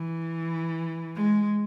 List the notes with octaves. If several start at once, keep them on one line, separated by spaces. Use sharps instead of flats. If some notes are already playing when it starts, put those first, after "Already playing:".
Already playing: E3
G#3